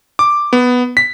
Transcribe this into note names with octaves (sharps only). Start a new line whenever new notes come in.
D6
B3
B6